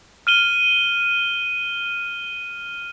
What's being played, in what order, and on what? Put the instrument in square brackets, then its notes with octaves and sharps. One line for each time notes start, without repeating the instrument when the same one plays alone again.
[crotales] F6 D#7 G7